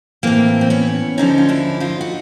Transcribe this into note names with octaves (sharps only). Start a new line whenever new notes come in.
A2 E3 A#3 C4
C4
B3 C#4
D#2 D3 F3 C#4 D#4
F4
D4 E4
D#4 F4
F#4